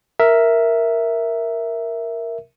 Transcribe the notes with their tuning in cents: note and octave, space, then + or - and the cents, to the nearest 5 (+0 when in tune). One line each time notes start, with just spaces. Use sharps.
A#4 +0 E5 +0